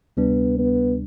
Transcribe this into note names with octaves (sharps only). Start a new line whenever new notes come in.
D2 C3 G3 B3 D4
B3